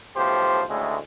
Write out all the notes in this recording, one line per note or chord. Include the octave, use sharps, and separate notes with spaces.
B1 A2 F3 G4 C5
D2 A2 C#3 G#3 A3